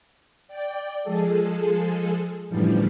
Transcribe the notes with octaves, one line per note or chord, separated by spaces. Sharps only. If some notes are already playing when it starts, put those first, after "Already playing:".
D5 G5 D6
F3 G#3 G#4 A4
F#2 A2 D3 E3 F3 G3